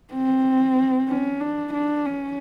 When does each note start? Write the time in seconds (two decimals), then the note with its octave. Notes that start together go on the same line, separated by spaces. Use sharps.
0.13 C4
1.08 C#4
1.40 D4
1.74 D4
2.05 C#4